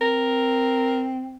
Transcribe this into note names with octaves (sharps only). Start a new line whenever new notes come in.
C4 A#4